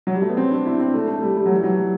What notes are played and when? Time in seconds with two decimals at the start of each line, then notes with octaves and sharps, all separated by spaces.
0.07 F#3
0.14 G3
0.22 A3
0.29 B3
0.37 C4
0.51 D4
0.66 E4
0.80 C4
0.94 A3
1.08 A3
1.22 G3
1.37 G3
1.46 F#3
1.55 E3
1.64 F#3